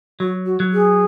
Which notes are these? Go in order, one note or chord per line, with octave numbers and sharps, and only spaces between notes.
F#3 F#4
F#4
F#3
G#4